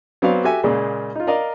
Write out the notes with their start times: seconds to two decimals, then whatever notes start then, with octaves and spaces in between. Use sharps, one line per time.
0.22 F#3 B3 C4 F#4 D5 F5
0.44 F#4 G4 A4 E5 G#5
0.63 A#2 C#3 G#3 A#3
1.15 D#4 F4
1.27 A#4 D5 D#5 F5